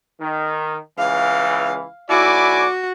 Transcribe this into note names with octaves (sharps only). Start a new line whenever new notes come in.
D#3
C#2 E3 F5
B1 E4 F#4 D5 G#5 D6